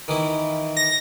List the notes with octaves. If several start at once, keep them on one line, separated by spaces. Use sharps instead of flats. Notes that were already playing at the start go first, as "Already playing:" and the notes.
D#3 E3 E4
A#6